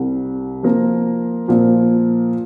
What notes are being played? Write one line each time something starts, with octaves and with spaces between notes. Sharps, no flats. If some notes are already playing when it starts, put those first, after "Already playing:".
Already playing: C2 C3 G3
F3 A#3 F4 A#4
A#2 F3 A#3